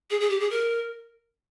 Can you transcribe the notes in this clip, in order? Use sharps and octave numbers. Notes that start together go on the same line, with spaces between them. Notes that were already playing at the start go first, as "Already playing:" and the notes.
G#4
G#4
G4
G#4
A#4